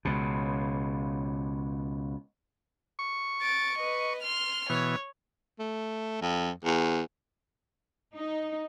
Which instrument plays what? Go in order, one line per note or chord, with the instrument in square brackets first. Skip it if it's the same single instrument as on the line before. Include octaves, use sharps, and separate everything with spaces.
[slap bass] C#2 B2
[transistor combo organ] C#6
[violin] A6 D7
B4 D#5
C6 F6
[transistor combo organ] B2 E3 [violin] C#5
[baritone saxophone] A3
F2
E2
[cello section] D#4